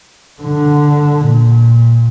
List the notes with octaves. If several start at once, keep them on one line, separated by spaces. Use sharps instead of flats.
D3
A#2